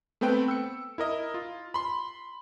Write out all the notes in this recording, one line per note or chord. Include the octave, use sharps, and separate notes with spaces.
A3 B3 C4 B4 G5
E6 C#7
E4 A#4 D#5
F4
B5 C6